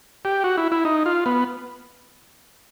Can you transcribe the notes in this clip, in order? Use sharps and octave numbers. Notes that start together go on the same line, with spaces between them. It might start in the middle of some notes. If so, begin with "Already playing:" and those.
G4
F#4
E4
E4
D#4
F4
B3